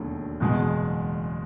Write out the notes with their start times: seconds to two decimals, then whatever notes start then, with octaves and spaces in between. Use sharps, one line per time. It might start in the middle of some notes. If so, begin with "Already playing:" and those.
Already playing: E1 D#2 D3 F#3 A3
0.40 F#1 E2 B2 G#3